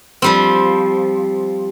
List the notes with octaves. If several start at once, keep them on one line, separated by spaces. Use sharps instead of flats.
F3 G3 C4